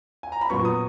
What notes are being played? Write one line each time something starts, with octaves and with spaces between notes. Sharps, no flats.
G#5
A#5
B5
A#2 F#3 B3 C#6
D#6